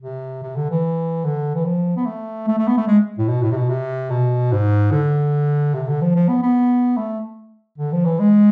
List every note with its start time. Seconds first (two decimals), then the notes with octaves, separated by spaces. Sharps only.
0.02 C3
0.43 C3
0.56 D3
0.70 E3
1.25 D3
1.55 E3
1.65 F3
1.97 B3
2.06 A3
2.48 A3
2.58 A3
2.67 B3
2.77 A3
2.88 G#3
3.18 A2
3.28 B2
3.42 A2
3.51 C3
3.56 B2
3.69 C3
4.10 B2
4.52 G#2
4.92 D3
5.74 C3
5.88 D3
6.01 F3
6.15 F3
6.28 B3
6.42 B3
6.97 A3
7.78 D3
7.92 F3
8.05 E3
8.19 G#3